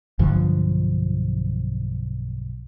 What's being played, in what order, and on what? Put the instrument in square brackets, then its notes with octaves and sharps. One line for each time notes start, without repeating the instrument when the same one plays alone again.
[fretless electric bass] B1 G2 D3 F3